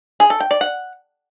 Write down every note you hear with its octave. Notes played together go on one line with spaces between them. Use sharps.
G#4
A4
G5
D5
F#5